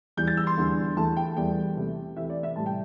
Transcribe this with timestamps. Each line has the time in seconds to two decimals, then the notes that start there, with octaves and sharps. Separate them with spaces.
0.17 E2 E3 G3 G6
0.27 A6
0.37 E6
0.47 C6
0.57 E2 D3 G3
0.97 E2 E3 A3 A5
1.17 G5
1.36 E2 E3 G3 G5
1.77 C3 A3
2.16 C3 E3 A3 E5
2.30 D5
2.43 E5
2.56 A2 G3 A5
2.66 G5